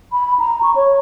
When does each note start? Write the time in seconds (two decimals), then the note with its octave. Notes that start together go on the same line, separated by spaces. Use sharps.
0.12 B5
0.39 A#5
0.63 C#6
0.76 C#5